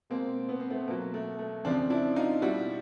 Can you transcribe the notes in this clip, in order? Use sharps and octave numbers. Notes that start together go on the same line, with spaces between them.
B2 G#3 A#3 C4
B3
C4
A3 B3
B2 F#3 A#3
A3
A3
F2 C#3 F3 C4 D4
D4 E4
D#4 F4
B2 G3 E4 F#4